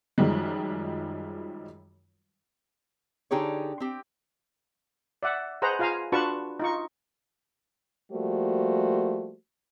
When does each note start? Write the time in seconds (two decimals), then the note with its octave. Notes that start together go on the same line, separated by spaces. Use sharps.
0.18 F#2 D#3 F3 G3 G#3
3.31 D3 D#4 G4 G#4 C#5
3.80 C4 G4
5.23 D5 E5 F#5
5.62 G#4 B4 C5 D#5 F#5 A#5
5.79 F4 G#4 F5 G#5 A#5
6.12 D4 F4 F#4 B4 A5 C#6
6.60 D#4 F4 C#6
8.11 F3 G3 A3 A#3 F#4 C5